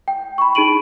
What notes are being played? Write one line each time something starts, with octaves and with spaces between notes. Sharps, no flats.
G5
B5 C#6
D#4 G#4 B5 D7 D#7 F#7